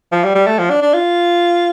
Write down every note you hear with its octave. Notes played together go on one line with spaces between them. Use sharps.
F3
G3
G3
A3
F3
D4
D4
F4